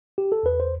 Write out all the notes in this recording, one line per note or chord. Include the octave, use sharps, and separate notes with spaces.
G4
A4
E2 B4
C5